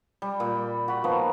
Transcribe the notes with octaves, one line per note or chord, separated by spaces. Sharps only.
G3
A#2
F#4 B5
D#3 F3 A#3 B3